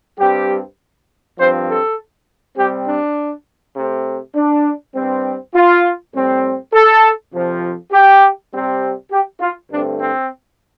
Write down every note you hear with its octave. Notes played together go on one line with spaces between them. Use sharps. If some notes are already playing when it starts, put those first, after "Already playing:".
G2 G3 C4 G4
G2 F3 C4 C5
A4
C3 G3 C4 G4
D4
C3 A3 C4
D4
G2 G3 C4
F4
A2 G3 C4
A4
F2 C3 F3
G4
C3 G3 C4
G4
F4
G2 D3 A3 C4 D4
C4